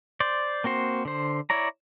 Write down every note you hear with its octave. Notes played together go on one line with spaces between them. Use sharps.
C5 D5
A#3 C4 F#4 C5
D3 C5
E4 C#5 D5 A#5